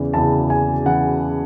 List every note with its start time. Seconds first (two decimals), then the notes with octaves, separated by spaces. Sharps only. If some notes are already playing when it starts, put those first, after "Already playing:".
Already playing: E2 C#3 E3
0.14 E2 C#3 E3 A5
0.50 G#5
0.86 C#3 E3 F#5